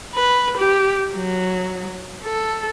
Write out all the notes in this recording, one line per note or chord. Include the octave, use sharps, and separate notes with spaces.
B4
G4
F#3
A4